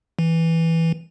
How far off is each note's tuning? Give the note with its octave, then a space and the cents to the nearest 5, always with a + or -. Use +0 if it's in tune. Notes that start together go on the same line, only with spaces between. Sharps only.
E3 -5